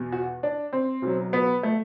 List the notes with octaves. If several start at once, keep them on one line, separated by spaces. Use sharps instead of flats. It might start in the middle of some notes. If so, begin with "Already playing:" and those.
Already playing: E2 B2
F#4
D4
C4
B1 B2 F#3
B3
A3